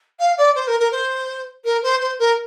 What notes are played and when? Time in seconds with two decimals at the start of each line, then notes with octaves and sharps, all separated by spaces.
0.19 F5
0.37 D5
0.55 C5
0.67 A#4
0.79 A#4
0.91 C5
1.64 A#4
1.82 C5
2.00 C5
2.19 A#4